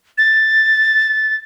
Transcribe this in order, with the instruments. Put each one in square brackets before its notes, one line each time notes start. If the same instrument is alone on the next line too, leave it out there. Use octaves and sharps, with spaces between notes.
[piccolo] A6